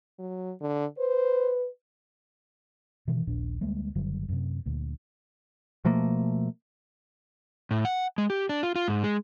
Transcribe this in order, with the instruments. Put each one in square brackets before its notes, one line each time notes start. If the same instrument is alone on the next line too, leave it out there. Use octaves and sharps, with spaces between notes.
[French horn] F#3
D3
[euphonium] B4 [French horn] C5
[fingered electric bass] B2 D#3 E3
D#1 A#1 A#2 D4
D2 G3 G#3 A#3
F#1 D3 F#3 G3
F#2 C3
D2 A#2
[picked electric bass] B2 F3 A3 A#3
[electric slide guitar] A2
F#5
G#3
G4
D4
F4
F4
G#2
G#3